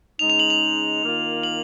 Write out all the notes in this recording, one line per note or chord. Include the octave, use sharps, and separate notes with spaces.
C#3 G#3 D#4 F7
F7
F#7
F7
D#3 A#3 F4
F#7